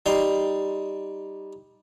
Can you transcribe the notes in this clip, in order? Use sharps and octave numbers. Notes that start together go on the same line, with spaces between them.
G3 D#4 C6